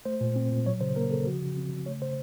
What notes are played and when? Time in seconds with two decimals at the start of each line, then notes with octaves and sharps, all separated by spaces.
0.05 A3 C5
0.21 A#2
0.36 C4
0.52 A#2
0.66 F#3 C#5
0.81 C#3 C5
0.96 A#3 A#4
1.11 C#3 A4
1.26 F3 F#4
1.42 C#3
1.56 C4
1.72 C#3
1.86 A3 C#5
2.02 C#3 C5